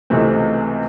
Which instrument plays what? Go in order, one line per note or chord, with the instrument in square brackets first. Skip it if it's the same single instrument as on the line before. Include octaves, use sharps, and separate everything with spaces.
[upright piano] C#2 C3 E3 A3 C4